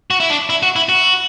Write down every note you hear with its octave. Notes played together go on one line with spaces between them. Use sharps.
F#4
E4
D4
E4
F#4
E4
F#4